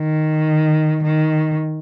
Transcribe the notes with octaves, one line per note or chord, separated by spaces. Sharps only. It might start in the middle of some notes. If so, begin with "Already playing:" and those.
Already playing: D#3
D#3